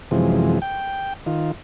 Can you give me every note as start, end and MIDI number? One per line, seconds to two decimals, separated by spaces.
0.11 0.59 42
0.11 0.59 48
0.11 0.59 52
0.11 0.59 53
0.11 0.59 56
0.62 1.13 79
1.26 1.52 51
1.26 1.52 65